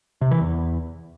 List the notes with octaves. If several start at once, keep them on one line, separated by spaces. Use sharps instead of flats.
C3
E3
E2